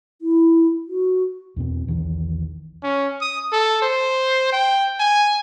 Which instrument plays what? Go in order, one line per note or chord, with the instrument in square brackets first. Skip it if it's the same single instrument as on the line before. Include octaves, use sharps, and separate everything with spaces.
[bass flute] E4
F#4
[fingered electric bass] E2 B2 C4
B1 E2 D#3 E3
[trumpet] C#4
D#6
A4
C5
G5
G#5